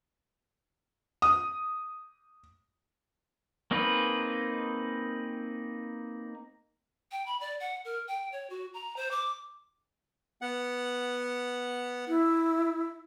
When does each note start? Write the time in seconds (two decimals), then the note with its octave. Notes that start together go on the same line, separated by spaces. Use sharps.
1.22 D#6
3.71 A#3 C4 D#4 G#4 B4
7.12 G5
7.26 B5
7.41 D5
7.60 F#5
7.85 A#4
8.08 G5
8.32 C#5
8.50 F#4
8.74 A#5
8.96 C5
9.11 D6
10.42 B3 F#5
12.08 E4